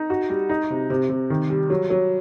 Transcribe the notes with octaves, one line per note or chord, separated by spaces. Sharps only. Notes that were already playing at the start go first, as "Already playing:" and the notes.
Already playing: D#4
F#4
G3
D#4
C3
C3
C3
D#3
G3
F#3
F#3